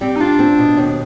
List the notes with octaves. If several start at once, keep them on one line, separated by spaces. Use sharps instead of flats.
G3 C4
D#4
D4 F4
C4
B2
D#2